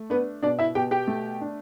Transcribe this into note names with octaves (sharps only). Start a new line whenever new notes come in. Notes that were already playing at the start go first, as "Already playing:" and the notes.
Already playing: A3
B3 D4 B4
B2 D4 D5
E4 E5
B2 G4 G5
G4 G5
A3
D4